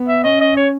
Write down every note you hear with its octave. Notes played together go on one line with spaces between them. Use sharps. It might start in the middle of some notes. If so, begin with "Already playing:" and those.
Already playing: B3
E5
C#4 D#5
D#5
C#5